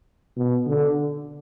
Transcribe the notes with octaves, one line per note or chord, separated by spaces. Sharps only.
B2
D3